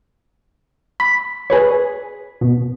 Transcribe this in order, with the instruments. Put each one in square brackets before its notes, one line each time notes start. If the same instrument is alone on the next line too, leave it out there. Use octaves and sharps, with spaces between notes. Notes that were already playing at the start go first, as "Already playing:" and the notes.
[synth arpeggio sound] B5 [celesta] B6
[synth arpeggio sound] G#4 B4 C#5
B2